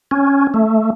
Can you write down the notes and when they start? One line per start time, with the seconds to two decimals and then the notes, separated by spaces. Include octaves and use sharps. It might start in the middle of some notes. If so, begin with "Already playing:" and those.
0.11 C#4
0.54 A3